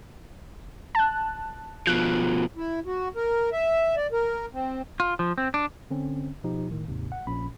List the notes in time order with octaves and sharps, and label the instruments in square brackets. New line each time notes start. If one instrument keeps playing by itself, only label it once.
[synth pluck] A5 F#6
[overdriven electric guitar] B2 F3 [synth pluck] F#6
[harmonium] E4
F#4
A#4
E5
D5
A#4
C4
[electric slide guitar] F4
F3
C4
D4
[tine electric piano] D3 C4 C#4
B2 F3 D#4 G4
A2 D#3
D#2 G#2 C3
F#5
A#1 A#2 C#4 B5